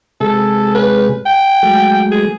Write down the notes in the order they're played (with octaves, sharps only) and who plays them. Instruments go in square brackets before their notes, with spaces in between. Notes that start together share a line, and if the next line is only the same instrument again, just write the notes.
[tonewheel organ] C3 G#3 G#4 [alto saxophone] A4
[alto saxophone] B4
G5
[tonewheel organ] F#3 G#3 A3
[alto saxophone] G#4